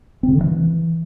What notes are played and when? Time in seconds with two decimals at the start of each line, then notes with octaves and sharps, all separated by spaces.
0.23 C4
0.28 C3
0.34 D3
0.39 D#3
0.44 E3